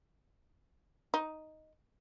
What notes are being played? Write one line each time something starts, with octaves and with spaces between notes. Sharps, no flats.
D#4